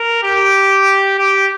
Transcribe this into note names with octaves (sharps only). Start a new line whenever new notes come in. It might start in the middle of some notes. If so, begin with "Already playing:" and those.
Already playing: A#4
G4
G4